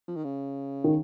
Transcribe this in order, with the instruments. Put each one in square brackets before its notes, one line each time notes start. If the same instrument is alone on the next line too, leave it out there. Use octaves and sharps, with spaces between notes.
[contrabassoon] F3
D#3
C#3
[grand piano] D#3